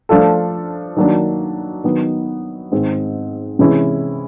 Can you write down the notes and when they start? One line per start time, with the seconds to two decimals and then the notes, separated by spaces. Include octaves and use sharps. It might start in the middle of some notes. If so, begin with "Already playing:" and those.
0.09 F3 A3 D4 F4 A4
0.97 D#3 F#3 A#3 D4
1.84 D#3 F#3 B3 D#4
2.72 G#2 D#3 G#3 C4
3.59 C3 E3 G#3 C#4 E4